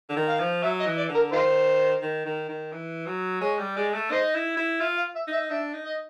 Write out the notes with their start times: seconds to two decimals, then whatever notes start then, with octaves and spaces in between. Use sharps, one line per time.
0.09 D3
0.16 D#3
0.28 F5
0.40 F3
0.63 F#3 E5
0.80 D#5
0.86 E3
0.98 D5
1.09 D3
1.15 A#4
1.32 D#3 D#4 F4 C5
2.02 D#3
2.26 D#3
2.49 D#3
2.72 E3
3.07 F#3
3.41 G#3 C#5
3.59 G3
3.76 G#3 D5
3.94 A3
4.11 D#4 C5 D#5
4.35 E4
4.57 E4
4.80 F4 E5
4.98 F5
5.16 E5
5.27 D#4
5.33 E5
5.50 D4 E5
5.74 D#4
5.85 D#5